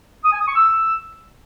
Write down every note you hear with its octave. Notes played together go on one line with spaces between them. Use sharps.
D#6
G#5
D#6
C#6
E6